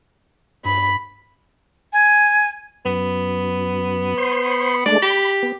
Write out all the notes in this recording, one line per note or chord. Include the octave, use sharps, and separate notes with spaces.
G2 B5
G#5
F#2 B3
C5 C6
G#3 A3 D4 D5
G4 B5
B3